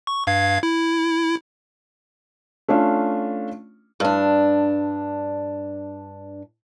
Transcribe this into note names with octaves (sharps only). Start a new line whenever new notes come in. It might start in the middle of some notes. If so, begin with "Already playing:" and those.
C#6
G2 F5 G#6
E4
A3 C#4 D4 F4
G2 D4